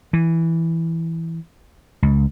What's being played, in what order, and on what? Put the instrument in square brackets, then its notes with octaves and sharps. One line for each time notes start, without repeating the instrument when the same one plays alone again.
[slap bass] E3
C#2